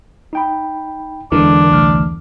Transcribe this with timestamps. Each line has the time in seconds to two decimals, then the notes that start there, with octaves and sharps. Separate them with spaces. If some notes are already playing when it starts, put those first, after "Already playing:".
0.33 D#4 G5 B5
1.32 E2 D3 E3 G#3 D4 A#4
1.70 C2 A3 F6